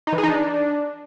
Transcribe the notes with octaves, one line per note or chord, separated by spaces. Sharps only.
D#4
E3
G#4
D#4
D4